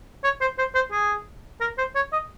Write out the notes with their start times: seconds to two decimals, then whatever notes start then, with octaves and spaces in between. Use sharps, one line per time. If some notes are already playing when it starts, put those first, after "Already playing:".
0.24 C#5
0.41 C5
0.58 C5
0.75 C5
0.92 G#4
1.61 A#4
1.78 C5
1.96 C#5
2.13 D#5